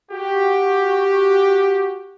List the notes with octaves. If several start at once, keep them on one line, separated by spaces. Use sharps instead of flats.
F#4 G4